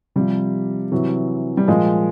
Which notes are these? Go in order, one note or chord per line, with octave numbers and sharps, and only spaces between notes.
C3 F3 G3
C3 E3 F#3
G3
A#2 F3 G#3